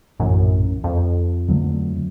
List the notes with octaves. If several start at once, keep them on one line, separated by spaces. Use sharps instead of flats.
A#1 F#2 A2 E3
F2
D#2 D3 F#3 A3